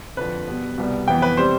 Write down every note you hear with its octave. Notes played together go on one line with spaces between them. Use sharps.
F2 D3 F3 B4
B2 G3 B3
C2 B2 G3 B3
F2 E3 B3 G5
B4
C3 G3 C5